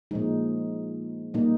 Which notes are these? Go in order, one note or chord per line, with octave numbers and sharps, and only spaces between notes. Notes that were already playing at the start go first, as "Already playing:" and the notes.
A#2 F3 G#3 D#4
A#2 G3 A#3 D#4